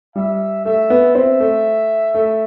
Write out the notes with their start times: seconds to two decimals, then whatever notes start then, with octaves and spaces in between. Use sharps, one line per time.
0.16 G3 E5
0.65 A3 E5
0.90 B3
1.15 C4 E5
1.40 A3
2.14 A3